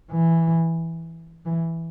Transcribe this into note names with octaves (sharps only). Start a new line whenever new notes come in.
E3
E3